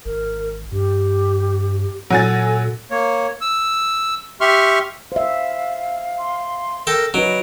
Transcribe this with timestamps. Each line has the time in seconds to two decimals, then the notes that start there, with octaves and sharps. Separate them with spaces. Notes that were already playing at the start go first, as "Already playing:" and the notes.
0.05 G#1 A#4
0.72 G2 G4
2.10 A#2 F#3 A4 G#5 A6
2.91 A#3 C#5
3.41 E6
4.41 G4 E5 C6 C#6 F6
5.12 C5 E5 F5
6.18 C6
6.87 A4 A#4 G5 A#6
7.14 F#3 C#4 D#4 B4 D#5 D7